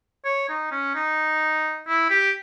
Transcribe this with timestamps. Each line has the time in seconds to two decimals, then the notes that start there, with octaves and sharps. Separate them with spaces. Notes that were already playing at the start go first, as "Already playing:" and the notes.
0.25 C#5
0.49 D#4
0.71 C#4
0.95 D#4
1.87 E4
2.10 G4